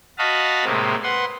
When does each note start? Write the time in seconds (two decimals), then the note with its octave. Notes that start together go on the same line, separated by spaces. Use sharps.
0.18 F#4 D#5 F5 A5 B5
0.65 A2 C3 G#3 A#3
1.03 B4 F#5 C6